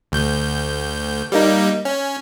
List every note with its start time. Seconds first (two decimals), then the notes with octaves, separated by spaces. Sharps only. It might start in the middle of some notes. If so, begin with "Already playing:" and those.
0.12 D2 G6
1.32 G3 A#3 D#4
1.85 C#4